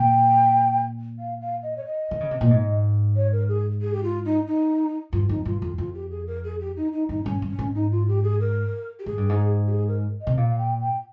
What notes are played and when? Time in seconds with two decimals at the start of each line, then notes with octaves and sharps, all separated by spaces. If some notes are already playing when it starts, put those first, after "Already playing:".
Already playing: A#2 G5
1.19 F5
1.41 F5
1.63 D#5
1.77 C#5
1.85 D#5
2.11 D#3
2.20 C#3
2.31 C3
2.41 A#2
2.50 G#2
3.16 C#5
3.33 A#4
3.49 G#4
3.82 G#4
3.94 G4
4.04 F4
4.25 D#4
4.47 D#4
5.13 G2 F4
5.29 F2 D#4
5.45 G2 F4
5.62 F2 F4
5.78 F2 F4
5.95 G4
6.11 G#4
6.27 A#4
6.44 G#4
6.60 G4
6.77 D#4
6.93 D#4
7.09 G2 D#4
7.23 G2 C#4
7.42 G2
7.50 C#4
7.59 G#2
7.75 D#4
7.91 F4
8.08 G4
8.24 G#4
8.40 A#4
8.99 G4
9.06 G#2 G#4
9.18 G2
9.29 G#2
9.67 G4
9.72 G#4
9.88 A#4
10.21 D#5
10.27 C3
10.37 A#2 F5
10.50 F5
10.58 G5
10.81 G5